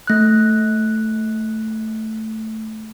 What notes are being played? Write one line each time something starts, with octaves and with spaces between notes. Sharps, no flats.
A3 F#6